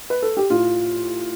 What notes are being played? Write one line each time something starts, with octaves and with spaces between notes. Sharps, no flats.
B4
A4
G4
A2 F4